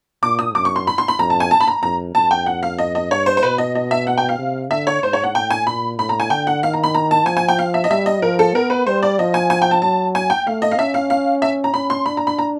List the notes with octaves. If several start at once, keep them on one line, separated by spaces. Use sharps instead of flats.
A#2 D6
D#6
F#2 D6
C#6
C6
B5
C6
B5
F2 A#5
A5
G#5
A5
B5
A#5
F2 A#5
F2 A5
G5
F#5
F5
D#5
D#5
G2 C#5
C5
C5
B2 B4
D#5
D#5
E5
F#5
G5
F5
C3
D3 E5
C#5
G#2 C5
C#5
F#5
A2 G5
G#5
A#2 B5
A2 B5
A#5
G#5
D3 G5
F#5
D#3 F5
A#5
B5
A#5
A5
F3 G#5
G#5
G5
F5
E5
D#5
G3 E5
D#5
F3 A#4
A4
B3 A#4
B4
G3 C5
D5
F3 D#5
G#5
G#5
G5
A5
F#3 A5
G#5
G5
A3 F5
D#5
F5
C#4 E5
F5
F5
E5
A#5
C#4 B5
C6
D4 B5
A#5
B5
A#5